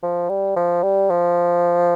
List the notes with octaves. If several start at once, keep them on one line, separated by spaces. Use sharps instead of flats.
F3
G3
F3
G3
F3